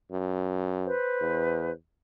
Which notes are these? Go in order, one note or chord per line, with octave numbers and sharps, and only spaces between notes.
F#2
B4 C5
E2